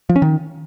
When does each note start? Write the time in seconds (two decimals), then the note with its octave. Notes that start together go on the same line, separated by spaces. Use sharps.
0.09 F3
0.16 C#4
0.22 D#3